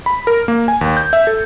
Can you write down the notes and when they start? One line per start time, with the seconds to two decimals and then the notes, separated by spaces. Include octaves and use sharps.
0.06 B5
0.27 A#4
0.48 A#3
0.68 G#5
0.81 D#2
0.97 G6
1.13 E5
1.27 A4